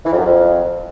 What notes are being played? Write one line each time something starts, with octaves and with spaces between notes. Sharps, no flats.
E3
F2
F#2
F2